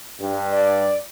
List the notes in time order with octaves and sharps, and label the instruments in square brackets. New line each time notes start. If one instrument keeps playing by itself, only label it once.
[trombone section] G2
[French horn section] D5